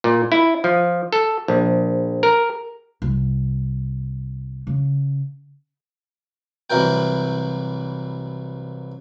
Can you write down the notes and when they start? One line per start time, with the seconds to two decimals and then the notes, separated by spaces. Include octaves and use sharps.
0.04 A#2
0.32 E4
0.64 F3
1.13 A4
1.48 A#1
2.23 A#4
3.02 C2
4.67 C#3
6.70 C2 E3 F#3 A#4 G5